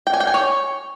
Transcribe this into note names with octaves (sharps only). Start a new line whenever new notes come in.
G5
G#5
G5
G#5
C#5